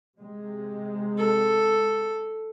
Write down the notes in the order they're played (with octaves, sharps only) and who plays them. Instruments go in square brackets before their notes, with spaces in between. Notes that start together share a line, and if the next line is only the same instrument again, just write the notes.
[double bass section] C3 G#3
[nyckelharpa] A4